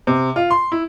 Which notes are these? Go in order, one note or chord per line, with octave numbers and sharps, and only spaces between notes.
C3
F4
C6
E4